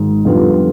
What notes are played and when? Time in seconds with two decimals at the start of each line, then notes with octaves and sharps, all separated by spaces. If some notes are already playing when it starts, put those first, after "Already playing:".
Already playing: G#1 G#2
0.25 F2 D3 G3 B3 F4